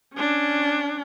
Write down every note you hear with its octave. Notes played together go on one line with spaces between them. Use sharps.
C#4 D4